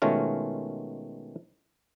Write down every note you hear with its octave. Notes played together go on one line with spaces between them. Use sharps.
B2 D#3 G#3 A3 C#4 F4